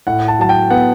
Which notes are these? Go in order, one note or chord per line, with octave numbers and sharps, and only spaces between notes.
A2 F#5
A5
F#3 A5
G5
B3 F#5